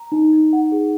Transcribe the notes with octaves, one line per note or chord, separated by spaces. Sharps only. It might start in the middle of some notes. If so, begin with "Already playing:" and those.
Already playing: A#5
D#4
D#4
F#5
G#4